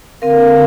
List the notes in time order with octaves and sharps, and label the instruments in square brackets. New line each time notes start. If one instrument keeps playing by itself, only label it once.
[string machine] D3 [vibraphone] C4 A#4 F5